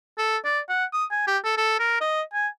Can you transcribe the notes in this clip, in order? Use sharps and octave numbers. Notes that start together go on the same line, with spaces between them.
A4
D5
F#5
D#6
G#5
G4
A4
A4
A#4
D#5
G#5